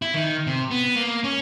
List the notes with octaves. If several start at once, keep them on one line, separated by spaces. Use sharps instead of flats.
E4
D#3
C3
B3
A#3
C#4